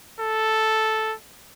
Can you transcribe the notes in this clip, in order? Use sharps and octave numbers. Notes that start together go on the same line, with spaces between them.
A4